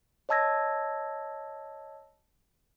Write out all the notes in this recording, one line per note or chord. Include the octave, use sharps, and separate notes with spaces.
C#5 D#5 A5 E6 G#6 A#6